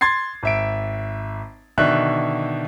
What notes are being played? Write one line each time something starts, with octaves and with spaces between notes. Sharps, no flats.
C6 G#6 A6 C7
G#1 E5 D7
B2 D3 D#3 E5 F#6